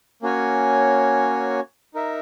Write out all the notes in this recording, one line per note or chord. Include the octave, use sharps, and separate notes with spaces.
A#3 C#4 F#4 C#5 G#5
D#4 A#4 E5